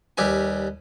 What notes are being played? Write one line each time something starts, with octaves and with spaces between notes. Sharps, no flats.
D#2 G3 G4 B4 G#5